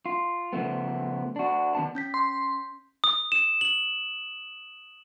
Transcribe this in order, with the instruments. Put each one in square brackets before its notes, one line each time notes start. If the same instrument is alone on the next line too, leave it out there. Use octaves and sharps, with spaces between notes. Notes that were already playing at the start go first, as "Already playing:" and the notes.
[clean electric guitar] F4
C#3 F3 A3 B3
D4 F#4
D#3 B3 A5
[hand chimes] C#4 G6 B6
[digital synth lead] C6
[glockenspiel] D#6
E7
F#7